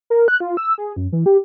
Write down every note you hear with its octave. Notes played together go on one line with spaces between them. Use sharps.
A#4
F#6
F4
E6
G#4
F#2
E3
G4